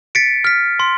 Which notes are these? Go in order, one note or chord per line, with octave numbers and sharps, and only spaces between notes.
A6 B6 C#7 D7
F6 B6
C6